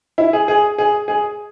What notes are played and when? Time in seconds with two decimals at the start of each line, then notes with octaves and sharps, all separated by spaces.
0.18 E4
0.33 G#4
0.48 G#4
0.78 G#4
1.08 G#4